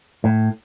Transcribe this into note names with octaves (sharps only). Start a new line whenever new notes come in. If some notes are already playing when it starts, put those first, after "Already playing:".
A2